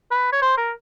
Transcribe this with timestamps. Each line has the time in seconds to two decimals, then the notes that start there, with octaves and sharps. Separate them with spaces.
0.11 B4
0.32 C#5
0.42 C5
0.58 A#4